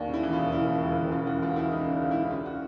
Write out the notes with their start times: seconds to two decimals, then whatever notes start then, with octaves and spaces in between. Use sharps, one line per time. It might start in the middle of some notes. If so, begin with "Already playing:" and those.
Already playing: D#2 D4
0.08 C#3
0.14 E4
0.23 E3
0.33 F4
0.38 E1
0.52 C#3 E4
0.67 D#2
0.83 E1
0.97 E1
1.12 C#3 F4
1.27 E3 F#4
1.42 C#2 F4
1.56 C#2 E4
1.71 C#3 D#4
1.86 C#3 D4
2.01 C#2
2.11 E4
2.17 C#3
2.31 C#3 F4
2.46 F#4